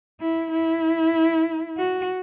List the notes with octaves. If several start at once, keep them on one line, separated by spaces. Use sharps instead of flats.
E4
E4
F#4